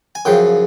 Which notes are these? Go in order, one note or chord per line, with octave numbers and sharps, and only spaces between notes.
G#5
F#2 C#3 F3 G5